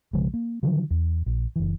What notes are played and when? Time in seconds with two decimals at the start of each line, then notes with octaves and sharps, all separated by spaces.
0.13 B1 C#3 F3 G#3
0.34 A#3
0.63 D3 D#3 F3 F#3
0.91 E2
1.26 A#1
1.56 F#1 E3